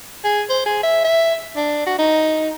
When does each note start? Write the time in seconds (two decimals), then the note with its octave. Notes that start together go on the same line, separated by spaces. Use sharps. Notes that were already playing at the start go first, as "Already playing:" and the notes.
0.24 G#4
0.49 C5
0.66 G#4
0.83 E5
1.04 E5
1.56 D4
1.86 F#4
1.99 D#4